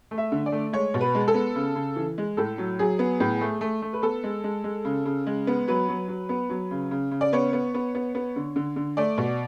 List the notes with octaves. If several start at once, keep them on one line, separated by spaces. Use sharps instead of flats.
A3
E5
D3
D5
A3
G#3 C#5
B2
B4
G#3
A4
B3
C#3
C#3
E3
G#3
A2 A4
F#3
F#3 G#4
B3
A2
A3
A3
A3
B4
B3 A4
G#3
G#3
G#3
C#3
C#3
G#3
B3
F#3 B4
F#3
F#3
B3
F#3
C#3
C#3
C#3
D5
B3 C#5
B3
B3
B3
B3
D3
D3
D3
A3 D5
B2